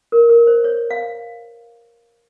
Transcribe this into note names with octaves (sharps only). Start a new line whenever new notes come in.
A#4
A#4
C5
C#5
F5